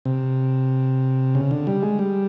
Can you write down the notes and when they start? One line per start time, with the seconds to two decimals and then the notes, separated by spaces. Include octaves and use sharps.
0.05 C3
1.35 C#3
1.51 D3
1.67 G3
1.83 G#3
1.99 G3